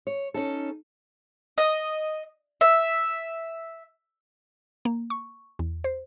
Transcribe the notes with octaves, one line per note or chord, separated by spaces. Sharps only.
C#5
C#4 D#4 A4
D#5
E5
A#3
C#6
E2
C5